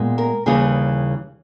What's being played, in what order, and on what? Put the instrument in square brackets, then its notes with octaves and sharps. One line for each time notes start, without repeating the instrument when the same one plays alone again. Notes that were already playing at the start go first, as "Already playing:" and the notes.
Already playing: [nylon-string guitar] A#2 G#3 B3
A#4
D#2 C#3 E3 G3 G#4